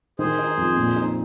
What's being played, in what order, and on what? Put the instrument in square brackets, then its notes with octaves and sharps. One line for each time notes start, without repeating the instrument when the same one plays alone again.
[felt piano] D#3 [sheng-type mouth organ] G#4 C5
[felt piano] D#4
F2
A#2
D#4